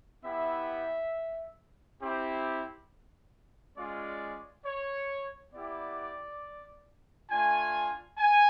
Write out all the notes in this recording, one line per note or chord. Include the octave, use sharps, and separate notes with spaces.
B3 E4 G4 E5
C4 E4 G4
G#3 C#4 F4 D5
C#5
B3 E4 G4 D5
A3 D4 F4 G#5
G#5